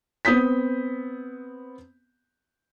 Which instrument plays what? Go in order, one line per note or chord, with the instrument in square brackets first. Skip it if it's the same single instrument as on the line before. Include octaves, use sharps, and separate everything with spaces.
[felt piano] B3 C4 D#6 G6 B6